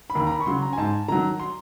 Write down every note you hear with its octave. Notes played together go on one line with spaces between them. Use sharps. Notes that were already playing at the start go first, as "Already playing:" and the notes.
B5
D#2 A#5
A#5
B5
C#6
C#3 F#3 C6
A#5
G#5
G#2 A5
D#3 F#3 A#5
C6